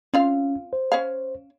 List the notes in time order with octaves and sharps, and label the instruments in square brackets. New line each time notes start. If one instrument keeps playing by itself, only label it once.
[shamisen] C4 F4 F5 [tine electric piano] C#4
[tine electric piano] C5
[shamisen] C#4 C#5 F5